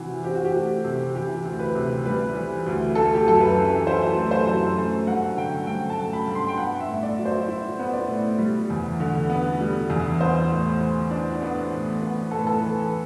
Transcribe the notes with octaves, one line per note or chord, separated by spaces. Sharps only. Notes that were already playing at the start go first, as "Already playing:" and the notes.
Already playing: C3 E3 F#4
C4 G4
F#4
G4
A3
C3
E3 G4
D2
B4
C3
G3 B4
E3
D2
A3 A4
G4
F#2 A4
B4
E3
E4 C5
A3
C5
F#2
A3
G2 F#5
D3 G5
G2 G5
A5
A3
B5
G2
C6
G5
B3 F#5
E5
A2
D5
F#3
C5
E4
B3
D5
A2
G3
E2
D3
B3
G3
E2
B3 C5
A2
E3
D4
B3
A2
B3 B4
A2 A4
B4
A4
E3 B4